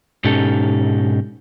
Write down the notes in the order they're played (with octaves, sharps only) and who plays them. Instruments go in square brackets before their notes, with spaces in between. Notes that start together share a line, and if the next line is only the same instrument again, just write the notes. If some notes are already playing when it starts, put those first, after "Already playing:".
[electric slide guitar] G#2 B2 C#4 D#4 G4 A4